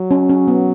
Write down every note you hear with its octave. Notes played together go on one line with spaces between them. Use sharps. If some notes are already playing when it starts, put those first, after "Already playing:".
Already playing: F#3
C#4
C#4
B3